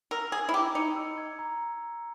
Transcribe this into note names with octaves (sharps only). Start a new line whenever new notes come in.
A#4 E6
G#4 G#6
E4
G4 A#5
D#4 C#7
E6
G#6
A#5